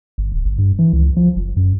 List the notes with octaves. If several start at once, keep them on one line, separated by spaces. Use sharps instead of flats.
G1
D1
G1
G2
E3
C#2
F3
F#1
F#2